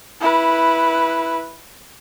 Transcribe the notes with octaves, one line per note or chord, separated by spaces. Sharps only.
E4 B4